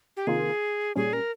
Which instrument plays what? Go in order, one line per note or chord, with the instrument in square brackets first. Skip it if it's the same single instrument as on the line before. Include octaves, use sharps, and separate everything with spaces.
[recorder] G4
[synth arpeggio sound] C3 D#3 A#3 F4 [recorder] G#4
[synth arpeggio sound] A#2 G3 C#4 [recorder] G#4
[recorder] A#4